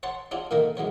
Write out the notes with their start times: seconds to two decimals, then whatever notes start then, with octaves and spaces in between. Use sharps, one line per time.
0.03 C#5 F#5 A5 C6
0.31 D4 F4 F#4 C#5
0.51 A#2 D3 D#3 A3 A#3
0.77 D2 G#2 F#3 C#5